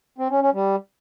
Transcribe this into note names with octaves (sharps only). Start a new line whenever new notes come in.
C4
C#4
C#4
G3